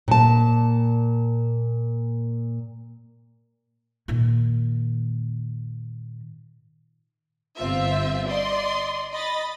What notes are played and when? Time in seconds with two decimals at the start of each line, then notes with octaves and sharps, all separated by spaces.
0.08 A#2 A5
4.08 A#2 D#3
7.57 G1 C4 F4 E5
8.26 D5 D#5 C6
9.13 D#5 B5 A6